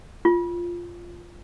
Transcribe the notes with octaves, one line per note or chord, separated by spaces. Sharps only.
F4